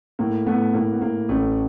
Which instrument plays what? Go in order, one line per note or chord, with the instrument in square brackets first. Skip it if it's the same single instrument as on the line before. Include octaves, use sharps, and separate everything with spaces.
[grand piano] A2 [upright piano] A#3
[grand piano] A2 [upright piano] A3 B3
[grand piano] A2 [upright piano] A#3
[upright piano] B3
[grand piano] A2 [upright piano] A#3
[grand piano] A1 [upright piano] A3